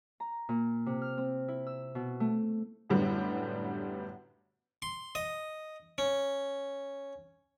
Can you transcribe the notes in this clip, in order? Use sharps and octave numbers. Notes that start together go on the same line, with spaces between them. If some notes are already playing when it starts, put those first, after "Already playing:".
A#5
A#2
C3
F6
C4
E4
E6
B2
A3
F#2 A2 D3 G3 B3 D4
C6
D#5
C#4